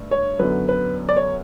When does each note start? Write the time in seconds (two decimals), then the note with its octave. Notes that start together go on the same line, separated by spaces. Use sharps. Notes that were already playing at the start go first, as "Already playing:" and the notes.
Already playing: G2 A3
0.11 C#5
0.39 F#2 D3 F#3 B3 B4
0.69 B4
1.09 D5
1.17 C#5